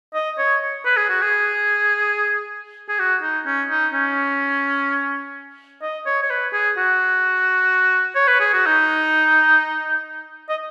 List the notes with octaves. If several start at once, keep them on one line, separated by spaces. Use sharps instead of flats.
D#5
C#5
B4
G#4
F#4
G#4
G#4
F#4
D#4
C#4
D#4
C#4
D#5
C#5
C#5
B4
G#4
F#4
C#5
B4
G#4
F#4
D#4
D#5